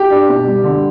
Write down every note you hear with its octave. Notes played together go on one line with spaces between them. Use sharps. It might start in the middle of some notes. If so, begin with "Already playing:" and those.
Already playing: G4
D4
B2
G3
D3